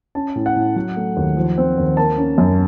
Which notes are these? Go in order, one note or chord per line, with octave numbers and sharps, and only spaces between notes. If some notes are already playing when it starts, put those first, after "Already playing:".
C#4 A5
A2
F#5
A2
F#3
A3
D#2
F3
C4
D#2
A#3 A5
C#4
F#2